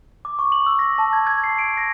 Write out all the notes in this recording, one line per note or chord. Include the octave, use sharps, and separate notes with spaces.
D6
C#6
F#7
E6
A#6
A5
G#6
G#6
C7
D7
A#6